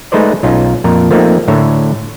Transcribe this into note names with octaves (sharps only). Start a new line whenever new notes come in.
G#3 A3 D#4 B4 C5 D5
B1 C#4 D#4 F4
F2 A#2 A#4
F3 A3 A#3 C4 D#4
A2 D3 C#5 E5 A#5